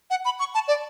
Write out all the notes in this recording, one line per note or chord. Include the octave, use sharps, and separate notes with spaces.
F#5
B5
C#6
A5
D5